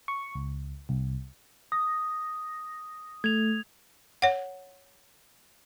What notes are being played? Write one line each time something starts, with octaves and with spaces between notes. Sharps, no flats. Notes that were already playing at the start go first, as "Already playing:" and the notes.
C#6
C#2
C2
D#6 A#6
A3 G#6 F7
C#5 F#5